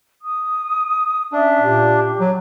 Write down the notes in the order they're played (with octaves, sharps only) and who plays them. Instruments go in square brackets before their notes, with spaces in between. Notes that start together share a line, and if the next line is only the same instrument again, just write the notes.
[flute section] D#6
[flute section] C#4 E5 A5 [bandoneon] D4
[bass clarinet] A#2 [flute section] G4
[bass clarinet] F#3